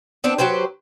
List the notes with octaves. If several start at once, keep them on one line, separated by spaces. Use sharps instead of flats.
B3 C4 D4
F#3 G4 B4 C5